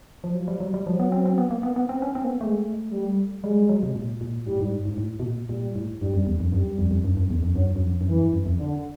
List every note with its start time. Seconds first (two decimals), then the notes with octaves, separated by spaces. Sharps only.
0.24 F3
0.35 F3 F#3
0.48 G3
0.60 F#3
0.74 G3
0.86 F3 F#3
1.00 B3
1.12 C4
1.26 C4
1.38 B3
1.51 A#3
1.63 B3
1.76 B3
1.89 C4
2.02 C#4
2.15 C4
2.24 A#3
2.28 B3
2.41 G#3 A3
2.92 G3
3.44 G3 G#3
3.69 F#3
3.83 C3
3.95 A#2
4.21 A#2
4.47 A2 G3
4.60 G#2
4.73 G2
4.85 G#2
4.98 A2
5.20 B2
5.24 A#2
5.49 A#2 G3
5.76 A2
6.01 G2 G3
6.14 F#2
6.27 E2
6.40 F2
6.52 F#2 G3
6.78 F2
6.91 F2
7.04 F#2
7.17 F#2
7.30 E2
7.43 F2
7.56 F#2 F#3
7.76 F#2
7.82 F2
8.01 F#2
8.07 F2 E3
8.20 G2
8.33 F#2
8.46 F2
8.59 D3